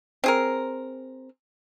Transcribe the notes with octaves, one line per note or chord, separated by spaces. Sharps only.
C4 G#4 A#4